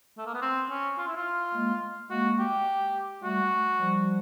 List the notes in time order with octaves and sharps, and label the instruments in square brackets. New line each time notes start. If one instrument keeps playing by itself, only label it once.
[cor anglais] A3
A#3
B3
C4
C#4
F4
E4
F4
[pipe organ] G#3 A#3
[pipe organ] G#3 A#3 [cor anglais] F#4
[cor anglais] G4
[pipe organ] G3 A3 [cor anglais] F#4
[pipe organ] F3 G3